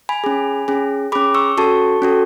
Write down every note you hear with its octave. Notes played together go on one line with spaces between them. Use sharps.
G#5 B5
C#4 G#4
C#4 G#4
C#4 G#4 B5 D6
C#6 E6
C#4 F#4 A4 A5 C#6
C#4 F#4 A4